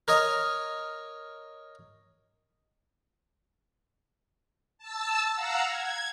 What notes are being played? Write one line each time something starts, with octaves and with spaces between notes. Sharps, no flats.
A#4 C#5 D#5
A5 E6
F5 F#5 A#5 E6
G#6